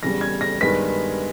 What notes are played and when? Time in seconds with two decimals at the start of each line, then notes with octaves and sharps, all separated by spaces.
0.03 E2 C#3 G3 A#6
0.21 G#6
0.41 A#6
0.61 G2 D#3 G#3 B3 B6